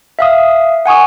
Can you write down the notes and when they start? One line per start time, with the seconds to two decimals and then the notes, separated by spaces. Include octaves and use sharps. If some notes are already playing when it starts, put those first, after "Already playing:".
0.19 E5 F5 D#6
0.86 F#5 G#5 C#6 D#6